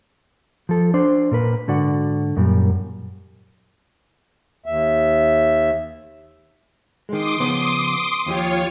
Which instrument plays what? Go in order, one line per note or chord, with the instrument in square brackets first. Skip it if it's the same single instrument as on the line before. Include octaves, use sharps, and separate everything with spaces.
[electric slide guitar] F3 A4
D4 C5
A#2 A#4 B4
G#2 D3 F#4 D5 F#5
F#2 A#2 G3
[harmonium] D#2 E5
[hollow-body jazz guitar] D#3 G#3 [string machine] C6 D6 D#6
[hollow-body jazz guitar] C#3 F3 B3
[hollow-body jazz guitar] D#2 F3 G4 [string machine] F4 C#5